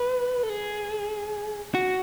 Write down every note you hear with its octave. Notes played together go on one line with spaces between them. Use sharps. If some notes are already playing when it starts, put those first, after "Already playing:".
Already playing: B4
A4
G#4
F#4